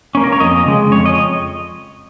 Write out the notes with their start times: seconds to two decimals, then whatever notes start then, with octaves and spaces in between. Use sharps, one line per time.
0.15 A#3 C#4
0.24 A#4
0.32 C#5
0.40 F2 D#5
0.66 C#3 G#3
0.92 F2 C#5
1.06 D#5